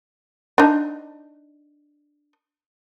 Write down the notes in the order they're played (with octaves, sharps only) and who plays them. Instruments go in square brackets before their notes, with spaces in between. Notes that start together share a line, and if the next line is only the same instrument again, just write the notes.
[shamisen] D4 D#4